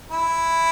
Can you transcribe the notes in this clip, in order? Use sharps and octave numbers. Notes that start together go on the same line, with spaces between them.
E4